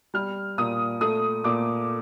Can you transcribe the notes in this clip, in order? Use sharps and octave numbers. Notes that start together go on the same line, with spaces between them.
G3 F6
A#2 D#6
A3 D#6
A#2 D6